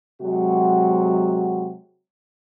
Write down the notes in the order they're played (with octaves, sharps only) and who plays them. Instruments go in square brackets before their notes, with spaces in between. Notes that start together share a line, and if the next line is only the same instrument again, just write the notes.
[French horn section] C3 F#3 G#3 F#4